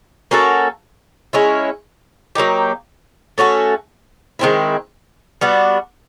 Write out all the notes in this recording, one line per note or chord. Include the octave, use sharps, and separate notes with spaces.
A#3 C#4 F#4 A4
G#3 C#4 E4
F#3 A#3 D#4 G4
A3 C#4 F#4 A4
D#3 G#3 C4 E4
G3 B3 D4 F#4